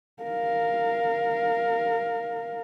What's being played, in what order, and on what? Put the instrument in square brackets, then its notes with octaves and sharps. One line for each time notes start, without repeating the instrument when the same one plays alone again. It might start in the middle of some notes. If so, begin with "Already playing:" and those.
[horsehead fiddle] A#4 F5